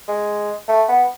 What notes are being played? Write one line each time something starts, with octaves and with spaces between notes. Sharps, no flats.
G#3
A3
B3